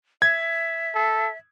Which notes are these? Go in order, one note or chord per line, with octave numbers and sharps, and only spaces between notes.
E5 G#6
A4